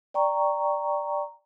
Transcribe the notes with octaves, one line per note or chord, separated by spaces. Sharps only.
D5 G5 A#5 C#6